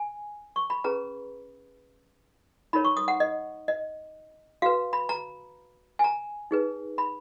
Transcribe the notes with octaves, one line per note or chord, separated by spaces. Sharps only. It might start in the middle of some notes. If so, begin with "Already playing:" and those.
Already playing: G#5
C#6
B5
C#4 G#4 B4 A#5
D#4 A#4 C#5 B5
C#6
D#6
F#5
D#5
D#5
F#4 B4 F5
B5
A#5
G#5
A#5
D#4 G#4 B4
B5